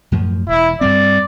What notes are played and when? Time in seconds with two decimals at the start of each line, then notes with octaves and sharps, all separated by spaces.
0.12 F#2 A2 F3
0.49 E1 E4
0.81 G2 G3 C4 D5